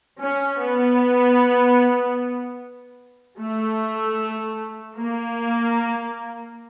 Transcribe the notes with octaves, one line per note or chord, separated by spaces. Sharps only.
C#4
B3
A3
A#3